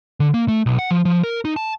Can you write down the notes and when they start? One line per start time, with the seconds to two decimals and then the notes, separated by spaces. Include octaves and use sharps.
0.20 D3
0.34 A#3
0.48 A3
0.66 B1
0.79 F#5
0.91 F3
1.05 F3
1.24 A#4
1.45 D#4
1.56 A5